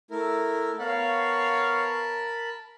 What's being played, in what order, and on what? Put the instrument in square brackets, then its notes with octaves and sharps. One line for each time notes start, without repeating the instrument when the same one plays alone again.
[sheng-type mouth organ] A3 E4 A#4
[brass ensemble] B3 C#5 F5 [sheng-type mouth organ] A#4 A5 B5